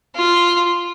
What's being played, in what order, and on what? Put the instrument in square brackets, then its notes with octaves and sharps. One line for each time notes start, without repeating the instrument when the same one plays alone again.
[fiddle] F4